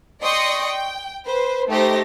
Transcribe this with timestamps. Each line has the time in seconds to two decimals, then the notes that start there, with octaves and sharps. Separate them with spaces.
0.22 D5 D#5 G5 C6 C#6 D#6
0.67 G5
1.26 B4 C5
1.70 A3 D#4 G4 C5 A#6